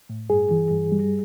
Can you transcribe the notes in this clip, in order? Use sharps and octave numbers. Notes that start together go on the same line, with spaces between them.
A2
G2 G#4
E3
G2
G3